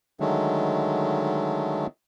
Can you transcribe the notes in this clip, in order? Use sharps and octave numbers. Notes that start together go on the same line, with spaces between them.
D3 D#3 F#3 G#3 A3